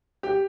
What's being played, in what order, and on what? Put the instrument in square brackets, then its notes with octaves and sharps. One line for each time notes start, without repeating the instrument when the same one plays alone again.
[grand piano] G4